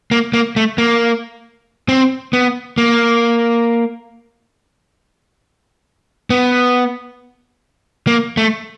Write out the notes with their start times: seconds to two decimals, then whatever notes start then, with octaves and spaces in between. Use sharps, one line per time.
0.11 A#3
0.33 A#3
0.56 A3
0.78 A#3
1.89 C4
2.33 B3
2.78 A#3
6.30 B3
8.07 A#3
8.37 A3